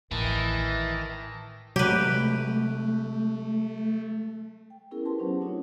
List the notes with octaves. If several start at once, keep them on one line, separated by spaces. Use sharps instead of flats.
A1 D#3 E3 A5 A#6
C3 F#3 G#3 A3 G4 B4
G5
B3 C#4 E4 G#4 A#4
G4 G#4 A#4 B4 A5 C6
F#3 C#4 D#4 C5
A3 C4 D4 D#4 F4 C#5